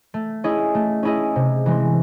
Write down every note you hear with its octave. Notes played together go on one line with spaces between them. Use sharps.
A3
C#4 E4 G#4 D#5
A3
C#4 E4 G#4 D#5
C3
E3 G#3 C4